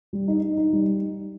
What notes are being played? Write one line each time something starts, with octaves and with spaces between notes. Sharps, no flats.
G3
D#4
D#4
D#4
G3